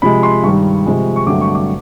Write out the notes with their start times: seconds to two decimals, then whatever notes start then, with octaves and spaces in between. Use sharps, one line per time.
0.02 C3 F3 G#3 B5
0.23 C6
0.44 G2 D#3 G3 C#6
0.86 C3 F3 G#3
1.16 C#6
1.27 G2 D3 F#3 A3 C4 D6
1.41 C#6
1.55 D6